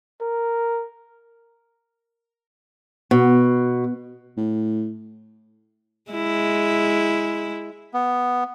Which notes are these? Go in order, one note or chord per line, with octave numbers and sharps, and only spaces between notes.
A#4
B2
A2
G#3 E4
B3